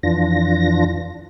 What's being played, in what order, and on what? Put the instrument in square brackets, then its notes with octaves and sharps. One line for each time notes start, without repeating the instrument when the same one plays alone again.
[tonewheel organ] F2 E3 D4 F4 A#6